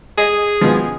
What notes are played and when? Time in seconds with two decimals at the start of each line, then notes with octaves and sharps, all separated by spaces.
0.18 G#4 D#5
0.61 B2 F3